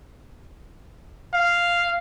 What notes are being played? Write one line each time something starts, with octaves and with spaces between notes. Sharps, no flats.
F5